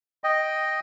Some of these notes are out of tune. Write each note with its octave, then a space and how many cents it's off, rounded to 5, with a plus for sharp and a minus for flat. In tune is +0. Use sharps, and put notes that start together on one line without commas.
D#5 +0 G5 +0